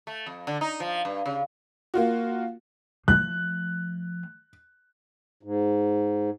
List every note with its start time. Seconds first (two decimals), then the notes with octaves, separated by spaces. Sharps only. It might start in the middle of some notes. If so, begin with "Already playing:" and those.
0.07 A3
0.26 F2
0.47 D3
0.61 D#4
0.80 F3
1.05 G2
1.26 C#3
1.94 A#3 F4 F#4
3.08 F3 A3 F#6
5.43 G#2